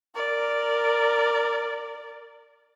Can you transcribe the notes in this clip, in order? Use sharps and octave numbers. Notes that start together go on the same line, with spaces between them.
A#4 D5